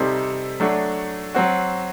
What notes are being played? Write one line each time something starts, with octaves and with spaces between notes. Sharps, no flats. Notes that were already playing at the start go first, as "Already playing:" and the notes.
Already playing: C3 G3 C4 D#4 A4
F#3 A3 D4 F#4
F#3 C4 F#4